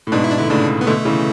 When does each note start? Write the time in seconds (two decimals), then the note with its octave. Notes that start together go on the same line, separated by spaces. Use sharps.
0.07 A2
0.12 G#2 B2 D4
0.24 E4
0.32 D4
0.37 D3 E4
0.50 A2 C#3 D4
0.81 B3
0.87 B2 D3 A3
1.05 C#3 E3